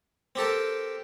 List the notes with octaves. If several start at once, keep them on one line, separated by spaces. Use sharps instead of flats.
C4 G4 A4 A#4